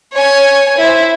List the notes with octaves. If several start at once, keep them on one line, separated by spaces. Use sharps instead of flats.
C#5 G#5
E4 C5